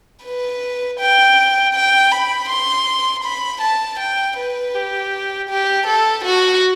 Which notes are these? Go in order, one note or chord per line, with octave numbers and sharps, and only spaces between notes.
B4
G5
G5
B5
C6
B5
A5
G5
B4
G4
G4
A4
F#4